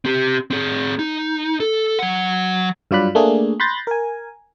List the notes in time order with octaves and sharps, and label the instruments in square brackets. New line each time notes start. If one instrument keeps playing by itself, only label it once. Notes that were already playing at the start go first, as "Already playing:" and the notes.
[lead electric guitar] C4 G4
C4 G#4
D#4
A4
F#3 F#5
[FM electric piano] G2 F#3 F4 D5 B5 F#6
A3 A#3 D4 G#4
B5 C6 F#6 G6 A6 A#6
A#4 G#5